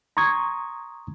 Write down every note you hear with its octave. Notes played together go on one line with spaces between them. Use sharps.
A#5 C6 C#6 D#6 G#6